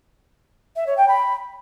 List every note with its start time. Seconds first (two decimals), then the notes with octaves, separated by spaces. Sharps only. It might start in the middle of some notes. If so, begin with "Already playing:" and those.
0.76 E5
0.86 C#5
0.97 G5
1.08 B5